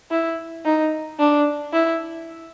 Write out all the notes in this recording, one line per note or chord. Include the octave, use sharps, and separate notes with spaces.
E4
D#4
D4
E4